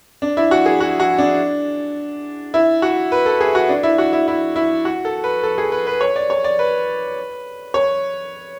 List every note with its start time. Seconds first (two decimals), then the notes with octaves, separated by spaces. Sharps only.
0.22 D4
0.37 E4
0.51 F#4
0.66 G#4
0.80 F#4
1.00 F#4
1.18 D4
2.54 E4
2.82 F#4
3.12 B4
3.26 A4
3.41 G#4
3.55 F#4
3.69 D4
3.83 E4
3.98 F#4
4.13 E4
4.28 E4
4.56 E4
4.85 F#4
5.05 A4
5.24 B4
5.43 A4
5.58 G#4
5.72 B4
5.87 B4
6.01 C#5
6.16 D5
6.30 C#5
6.44 D5
6.59 B4
7.74 C#5